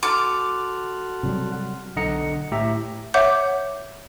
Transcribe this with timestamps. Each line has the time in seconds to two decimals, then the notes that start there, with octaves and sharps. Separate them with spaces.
0.03 F#4 A4 F#5 C6 D6 F6 F7
1.23 C3 F#3 G3
1.96 B1 D3 D#5 F#5 A#5 C#7
2.52 A2 G4 E5 A#5
3.14 C#5 E5 F#5 D6 G6